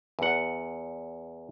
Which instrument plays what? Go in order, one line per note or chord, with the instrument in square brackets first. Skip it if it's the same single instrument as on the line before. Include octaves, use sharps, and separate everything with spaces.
[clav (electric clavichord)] E2 F#5